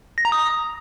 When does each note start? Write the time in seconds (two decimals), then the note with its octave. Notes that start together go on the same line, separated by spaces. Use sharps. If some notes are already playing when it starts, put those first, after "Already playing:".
0.18 A#6
0.25 A#5
0.32 D#6